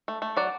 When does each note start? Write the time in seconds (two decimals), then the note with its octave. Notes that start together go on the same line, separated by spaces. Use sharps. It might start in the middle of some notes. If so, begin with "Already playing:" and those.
0.08 A3
0.22 A3
0.37 F#3 D5 F#5